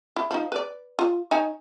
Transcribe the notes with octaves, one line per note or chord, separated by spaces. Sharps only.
E4
F3 D#4
B4 D5
F4
D#4 C#5 G#5